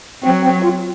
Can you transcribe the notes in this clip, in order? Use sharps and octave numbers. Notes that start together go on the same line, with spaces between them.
F#3 C4
C4
F4